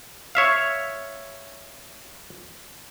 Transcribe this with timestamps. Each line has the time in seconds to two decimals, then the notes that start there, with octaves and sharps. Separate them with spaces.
0.35 C#5 E5 F5